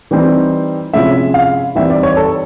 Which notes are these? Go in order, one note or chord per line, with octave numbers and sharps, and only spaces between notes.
E3 G3 C4 D#4
C3 F3 G#3 C#4 E4 E5
F5
E3 G3 C4 D#4 E5
D5
C#5
A4